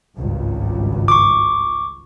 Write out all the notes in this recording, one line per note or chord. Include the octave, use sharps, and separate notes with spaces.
G#1 C#2 G2
C#6 D6